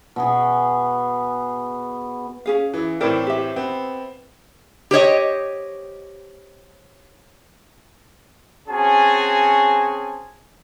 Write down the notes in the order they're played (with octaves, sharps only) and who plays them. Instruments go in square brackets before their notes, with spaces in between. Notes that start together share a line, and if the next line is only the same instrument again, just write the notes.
[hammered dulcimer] B2 B3 G#4
[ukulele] C#4 G#4 F5
[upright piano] E3 E4
[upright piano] A2 E3 C4 [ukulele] E4 A#4 D5
[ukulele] G4 E5
[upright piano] B3 C4
[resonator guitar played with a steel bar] G4 C5 C#5 D#5
[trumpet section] C4 C#4 F#4 G#4 G#5 A5